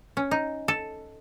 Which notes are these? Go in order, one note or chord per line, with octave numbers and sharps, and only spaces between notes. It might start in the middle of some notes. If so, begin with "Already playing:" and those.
C#4
D#4
A4